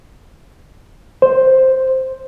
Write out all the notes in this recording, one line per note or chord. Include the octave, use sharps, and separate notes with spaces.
C5